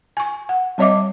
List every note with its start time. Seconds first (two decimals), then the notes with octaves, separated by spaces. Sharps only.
0.17 G#5 C#6
0.49 F#5
0.78 G3 C4 C#5 D#5 E5 D6